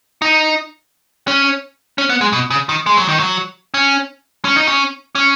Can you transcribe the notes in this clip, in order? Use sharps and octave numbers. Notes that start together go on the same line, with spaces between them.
D#4
C#4
C#4
B3
G#3
B2
C#3
D#3
G#3
F#3
D#3
F#3
C#4
C#4
D#4
C#4
C#4